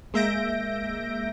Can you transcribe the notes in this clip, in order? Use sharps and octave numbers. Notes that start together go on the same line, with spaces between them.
G#3 A#3 E5 G6 A#6 D7